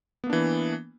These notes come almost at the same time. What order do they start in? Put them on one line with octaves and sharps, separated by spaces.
B3 A#3 D4 E3